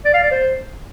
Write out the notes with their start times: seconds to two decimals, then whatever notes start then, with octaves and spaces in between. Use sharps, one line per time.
0.05 D5
0.14 F5
0.23 D5
0.31 C5